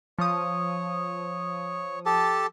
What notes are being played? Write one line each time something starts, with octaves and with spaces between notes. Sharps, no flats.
F3 C#5 D#6
G4 A4 A5